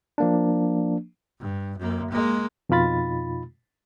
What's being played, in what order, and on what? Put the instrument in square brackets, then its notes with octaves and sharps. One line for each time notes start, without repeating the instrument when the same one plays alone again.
[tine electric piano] F3 A#3 D4
[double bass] G2
F#2 A#3
G#3 A#3
[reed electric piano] F2 B2 D#4 F4 B5 A6